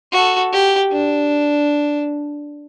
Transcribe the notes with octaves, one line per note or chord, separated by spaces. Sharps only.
F#4 A4
G4
D4